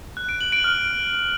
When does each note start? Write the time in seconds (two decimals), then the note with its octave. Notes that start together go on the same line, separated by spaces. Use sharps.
0.17 F#6
0.29 D7
0.41 F#7
0.52 D7
0.64 F6